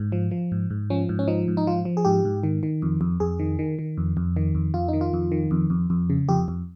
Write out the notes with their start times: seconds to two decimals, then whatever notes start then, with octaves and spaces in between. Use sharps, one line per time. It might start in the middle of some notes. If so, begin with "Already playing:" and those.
Already playing: G#2
0.12 F3
0.31 F3
0.52 G#2
0.70 G#2
0.90 F3 C#4
1.09 G#2
1.19 C#4
1.28 F3 D#4
1.48 G#2
1.57 D#4
1.67 F3 F4
1.85 F3
1.97 G#4
2.05 G#2 G4
2.25 G#2
2.43 D#3
2.63 D#3
2.82 F2
3.01 F2
3.20 F2 G#4
3.39 D#3
3.59 D#3
3.79 D#3
3.98 F2
4.17 F2
4.37 D#3
4.55 F2
4.74 F2 F4
4.88 D#3 D#4
5.01 F4
5.14 F2
5.32 D#3
5.51 F2
5.70 F2
5.90 F2
6.10 C#3
6.29 F2 G4
6.48 F2